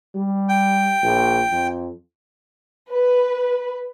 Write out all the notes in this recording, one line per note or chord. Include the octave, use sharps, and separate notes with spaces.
G3
G5
A#1
F2
B4